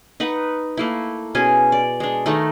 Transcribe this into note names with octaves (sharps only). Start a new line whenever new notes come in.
D#4 B4 F#5
A3 A#3 E4
B2 C#4 G#4 G#5
D5
G#3 D4
D#3 A3 D#4